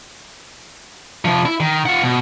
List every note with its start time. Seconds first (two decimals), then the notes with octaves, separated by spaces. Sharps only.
1.25 C3 F3
1.46 E4
1.60 D#3
1.86 F4 F#5
2.02 B2